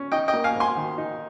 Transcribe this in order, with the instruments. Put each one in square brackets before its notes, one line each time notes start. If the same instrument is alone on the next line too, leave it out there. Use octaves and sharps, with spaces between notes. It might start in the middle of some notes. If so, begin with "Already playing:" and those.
Already playing: [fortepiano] C#4
D#4 D#5 G5
D#5 G5
A#3
F5 G#5
G#2
G#5 C6
D#3
D#4